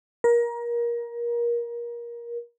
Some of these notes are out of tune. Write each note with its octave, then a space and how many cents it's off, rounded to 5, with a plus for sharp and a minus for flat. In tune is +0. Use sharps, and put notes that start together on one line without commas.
A#4 +25